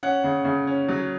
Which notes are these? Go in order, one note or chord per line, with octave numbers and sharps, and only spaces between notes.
C#4 F#5
C#3
C#3
C#4
F#3